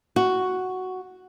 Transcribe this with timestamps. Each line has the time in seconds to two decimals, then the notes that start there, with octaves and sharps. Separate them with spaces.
0.16 F#4